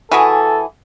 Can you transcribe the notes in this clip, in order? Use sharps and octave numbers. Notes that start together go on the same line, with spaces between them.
E3 F#4 G#4 A4